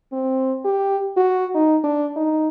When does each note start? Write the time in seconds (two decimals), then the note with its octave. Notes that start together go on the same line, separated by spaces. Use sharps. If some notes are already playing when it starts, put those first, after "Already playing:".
0.12 C4
0.65 G4
1.17 F#4
1.55 D#4
1.84 D4
2.16 D#4